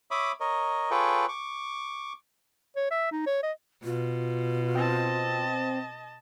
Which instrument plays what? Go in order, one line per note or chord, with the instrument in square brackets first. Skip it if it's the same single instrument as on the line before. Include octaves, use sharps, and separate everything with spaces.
[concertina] C#5 E5 B5 D6 D#6
A#4 C#5 D#5
F4 G#4 A4 B4 C#5 G5
C#6 D6
[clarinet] C#5
E5
D#4
C#5
D#5
[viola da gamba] B2 [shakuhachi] F4
[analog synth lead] C4 [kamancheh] D#5 A5